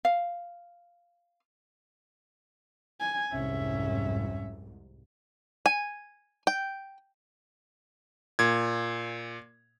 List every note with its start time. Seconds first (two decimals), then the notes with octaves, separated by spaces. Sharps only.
0.05 F5
3.00 G#5
3.32 C2 F2 G#2 C#4 E5
5.66 G#5
6.47 G5
8.39 A#2 G#6